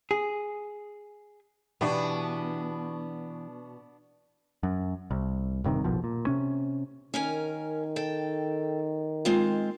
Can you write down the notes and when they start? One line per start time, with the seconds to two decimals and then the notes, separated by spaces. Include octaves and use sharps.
0.11 G#4
1.81 B2 E3 B3 D4 E4 G4
4.63 F#2
5.11 C2
5.64 E1 G2 C3 D#3
5.84 F1 A#1 B2 F3
6.04 A#2
6.27 C3 C#4
7.14 D#3 C#4 A#4 G#5
7.96 A4 G5
9.25 G#3 C4 F4